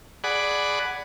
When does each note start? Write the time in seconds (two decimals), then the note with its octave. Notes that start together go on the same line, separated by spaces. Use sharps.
0.24 G#4 D5 F#5 B5